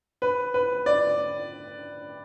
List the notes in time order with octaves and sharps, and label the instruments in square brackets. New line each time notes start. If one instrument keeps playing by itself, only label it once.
[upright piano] B4
B4
D5